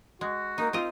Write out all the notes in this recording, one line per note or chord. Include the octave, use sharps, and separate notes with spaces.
G#3 F#4
A#3 D#4
C4 F4 A#4 D#5